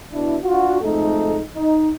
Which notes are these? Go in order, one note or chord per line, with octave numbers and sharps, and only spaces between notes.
B2 D4 E4
D4 F4 F#4
F2 G#2 A3 D#4 A4
D#4